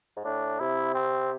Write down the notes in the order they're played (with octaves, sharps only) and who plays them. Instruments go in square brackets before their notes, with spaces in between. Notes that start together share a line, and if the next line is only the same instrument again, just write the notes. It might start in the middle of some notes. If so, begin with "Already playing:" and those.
[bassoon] G#2
[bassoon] A2 [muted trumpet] D4
[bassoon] C3 [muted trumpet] E4
[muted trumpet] C4